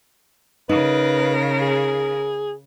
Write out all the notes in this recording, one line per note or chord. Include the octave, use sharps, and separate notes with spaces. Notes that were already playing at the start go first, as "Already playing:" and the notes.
C#3 D#4 A#4 B4
G#4